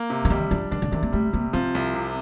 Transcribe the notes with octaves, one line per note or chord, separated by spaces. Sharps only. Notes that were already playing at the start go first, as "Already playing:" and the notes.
Already playing: A#3
C3
D3
D#3 G3
F3 D4
D#3 D4
D3
C3 D#3
A#3
G3 A3
C3 A#3
F3 C4
C2
C3